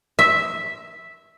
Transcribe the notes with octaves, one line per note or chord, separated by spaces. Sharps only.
E5